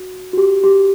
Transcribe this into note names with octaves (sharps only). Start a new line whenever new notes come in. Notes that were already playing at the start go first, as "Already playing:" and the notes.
Already playing: F#4
F#4
G4
G4